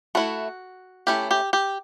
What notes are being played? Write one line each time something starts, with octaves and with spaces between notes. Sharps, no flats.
A3 E4 F#4
A3 C#4 E4 G4
G4
G4